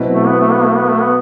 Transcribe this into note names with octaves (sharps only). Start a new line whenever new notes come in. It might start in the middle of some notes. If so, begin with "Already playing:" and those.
Already playing: B2 F#3 C4 E4 B4
A3
B3
A3
B3
A3
B3
A3
B3